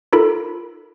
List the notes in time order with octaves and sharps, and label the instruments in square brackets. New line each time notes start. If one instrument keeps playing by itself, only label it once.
[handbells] D#4 F4 A4 A#4 B5